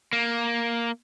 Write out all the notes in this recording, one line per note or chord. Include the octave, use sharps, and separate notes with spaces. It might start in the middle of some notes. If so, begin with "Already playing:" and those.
A#3